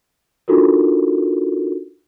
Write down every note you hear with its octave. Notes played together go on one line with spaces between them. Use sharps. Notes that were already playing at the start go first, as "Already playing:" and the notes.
D4 D#4 F4 F#4 A4 A#4